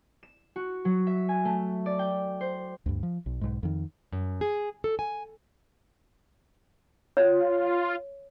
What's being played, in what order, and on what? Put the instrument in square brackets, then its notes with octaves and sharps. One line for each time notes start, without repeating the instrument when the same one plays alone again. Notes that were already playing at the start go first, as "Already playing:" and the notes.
[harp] E7
F#4
F#3
E5
G#5
A3
D5
G5
C5
[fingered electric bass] D2 G2
F3
B1
B1 G#2
F2 D#3
[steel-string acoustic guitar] F#2
G#4
A4
G#5
[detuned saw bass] F4 [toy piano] C#5